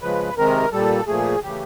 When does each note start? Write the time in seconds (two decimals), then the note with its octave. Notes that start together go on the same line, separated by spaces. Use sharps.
0.01 C#3 F3 G#3 B4
0.37 C3 D#3 G#3 A#4
0.72 A#2 G3 A4
1.08 A#2 F3 A3 G#4
1.43 C#3 E3 A3 G4